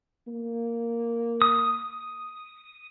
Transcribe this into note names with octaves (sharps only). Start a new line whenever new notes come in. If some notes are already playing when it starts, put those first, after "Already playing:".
A#3
D#6